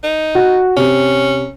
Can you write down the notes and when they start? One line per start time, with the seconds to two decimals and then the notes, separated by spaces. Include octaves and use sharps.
0.03 D#4
0.35 F#4
0.77 C3 C#4